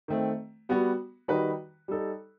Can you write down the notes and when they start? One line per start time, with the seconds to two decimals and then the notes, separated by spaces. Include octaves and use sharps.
0.08 D#3 A3 C4
0.69 G3 B3 F#4
1.28 D#3 G3 D#4 F#4 B4
1.88 G3 D#4 A4